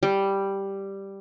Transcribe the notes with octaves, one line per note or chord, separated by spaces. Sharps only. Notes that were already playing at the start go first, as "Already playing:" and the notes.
G3